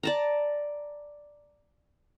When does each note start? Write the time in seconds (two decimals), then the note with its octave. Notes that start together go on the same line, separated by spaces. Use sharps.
0.03 D5 A5 A#5